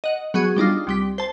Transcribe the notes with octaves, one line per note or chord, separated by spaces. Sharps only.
D#5 F#5
F#3 B3 F#4 G#4
G3 D4 D#4 F4
C2 G3 B6
C5 A5